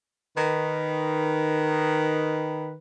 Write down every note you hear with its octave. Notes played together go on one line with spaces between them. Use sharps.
D#3 B4